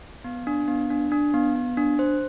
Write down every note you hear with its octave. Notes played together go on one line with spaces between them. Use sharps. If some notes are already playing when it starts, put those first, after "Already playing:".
B3
D4
B3
D4
D4
B3
B3
D4
C5